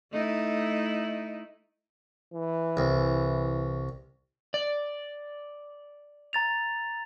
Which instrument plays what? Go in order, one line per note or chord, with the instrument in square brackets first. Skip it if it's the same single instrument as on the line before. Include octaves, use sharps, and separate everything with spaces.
[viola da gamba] A3 D#4 E4
[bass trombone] E3
[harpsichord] C2
[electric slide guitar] D5
[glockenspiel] A#5 A6 F7